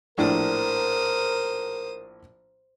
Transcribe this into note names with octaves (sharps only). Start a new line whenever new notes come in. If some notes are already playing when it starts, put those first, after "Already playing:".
A#1 A2 D4 A#4 C5 D#6